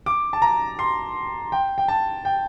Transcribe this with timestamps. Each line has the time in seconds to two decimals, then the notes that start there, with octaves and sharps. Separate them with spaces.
0.06 D6
0.33 A5
0.42 A#5
0.79 C6
1.52 G5
1.78 G5
1.88 A5
2.25 G5